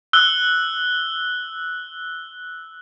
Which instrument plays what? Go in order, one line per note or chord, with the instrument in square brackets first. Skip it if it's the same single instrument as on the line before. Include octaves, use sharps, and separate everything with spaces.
[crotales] E6 F#6 G7